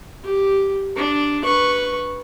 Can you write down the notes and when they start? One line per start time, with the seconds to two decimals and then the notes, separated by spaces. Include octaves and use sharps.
0.24 G4
0.96 D4
1.44 B4 C#6